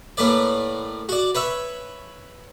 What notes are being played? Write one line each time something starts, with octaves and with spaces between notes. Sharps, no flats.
A2 A#3 B4 D5
F#4 D5
B4 C#5 E5